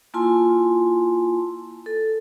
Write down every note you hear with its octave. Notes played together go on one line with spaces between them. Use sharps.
A#3 E4 F4 G#5 A5 C6
A4